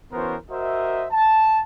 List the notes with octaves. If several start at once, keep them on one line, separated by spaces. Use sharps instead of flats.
E3 B3 C#4 F#4 A#4 C5
F#4 A#4 C5 D#5 E5
A5